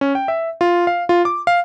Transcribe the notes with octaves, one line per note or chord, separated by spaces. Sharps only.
C#4
G5
E5
F4
F5
F4
D6
F5